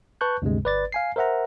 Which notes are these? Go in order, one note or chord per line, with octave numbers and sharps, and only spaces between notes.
B4 A5 C#6 F#6 G6
D2 G2 C3 G#3
G1 B4 D5 A6
F5 G#5 C7
A#4 C5 E5 F#5 A#5